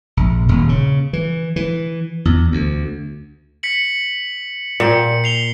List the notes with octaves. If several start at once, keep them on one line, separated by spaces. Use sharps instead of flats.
A#1
D#1
C#3
E3
E3
E2
D2
B6 C#7 F#7
A#2 G5 C#7
C7 F7 G7